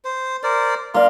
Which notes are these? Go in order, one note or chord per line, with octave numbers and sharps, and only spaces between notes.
C5
A#4 C5 D5
A#3 D5 F5 C6